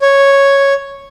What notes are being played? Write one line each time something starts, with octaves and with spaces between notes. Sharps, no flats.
C#5